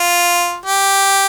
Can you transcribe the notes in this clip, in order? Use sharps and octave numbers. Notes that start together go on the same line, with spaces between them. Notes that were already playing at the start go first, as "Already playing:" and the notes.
Already playing: F4
G4